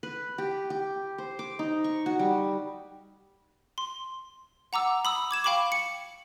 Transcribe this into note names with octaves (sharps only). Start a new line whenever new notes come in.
B4
G4
G4
C5
D6
D#4
C#6
F#4
G3
C6
F#5 A#5 D6 E6
B5 D#6 E6
D6 G#6 E7
F5 G5 B5 C#6 D6
C#7